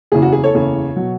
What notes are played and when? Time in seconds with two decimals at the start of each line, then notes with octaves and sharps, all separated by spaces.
0.12 F#1 E2 C#3 G#4
0.22 F#4
0.32 G#4
0.43 A4 C#5
0.54 F#1 E2 C#3
0.96 B2 F#3